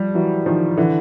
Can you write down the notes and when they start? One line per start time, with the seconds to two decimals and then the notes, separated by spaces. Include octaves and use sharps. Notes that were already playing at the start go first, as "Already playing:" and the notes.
Already playing: F3 G3
0.14 E3 F#3
0.46 D#3 F3
0.77 D3 E3